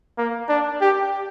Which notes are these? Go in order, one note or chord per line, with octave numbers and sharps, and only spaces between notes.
A#3
D4
G4